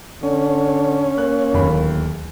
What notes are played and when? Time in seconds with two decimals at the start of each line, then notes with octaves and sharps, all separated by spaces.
0.23 D3 C#4
1.18 A#3 F#6
1.53 D1 D#2 B5